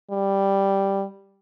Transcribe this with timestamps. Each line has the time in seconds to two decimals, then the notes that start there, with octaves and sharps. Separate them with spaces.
0.11 G3